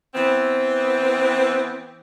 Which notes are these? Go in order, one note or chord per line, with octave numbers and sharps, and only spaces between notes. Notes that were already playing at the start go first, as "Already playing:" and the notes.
E3 B3 C4